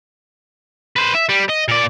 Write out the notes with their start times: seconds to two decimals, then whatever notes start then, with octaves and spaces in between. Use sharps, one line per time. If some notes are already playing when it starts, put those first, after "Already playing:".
0.96 B4 C5
1.15 E5
1.29 G3
1.49 D#5
1.68 A#2 D5